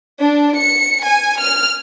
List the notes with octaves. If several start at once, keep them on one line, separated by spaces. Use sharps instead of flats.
D4
C#7
G#5
F6